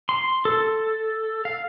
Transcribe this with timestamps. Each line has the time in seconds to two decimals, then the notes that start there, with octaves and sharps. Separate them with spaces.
0.09 C6
0.45 A4
1.45 F5